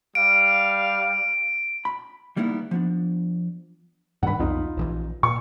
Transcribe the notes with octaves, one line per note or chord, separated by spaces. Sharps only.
G3 F5 D7
B5
D#3 G3 A#3 B3 D#4 E4
F3 B3 D4
G2 D#3 D4 F#5 B5
B1 F2 D#4 F4
A#1 C#3 E3
A#2 C#6